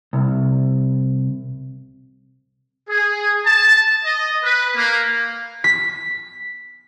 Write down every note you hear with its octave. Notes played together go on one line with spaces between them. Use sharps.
C2
G#4
A5
D#5
B4
A#3
B6